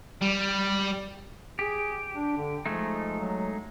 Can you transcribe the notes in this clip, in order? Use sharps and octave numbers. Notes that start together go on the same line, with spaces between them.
G3
G4 G#4
D4
D3
F3 G#3 A3 D#4
F#3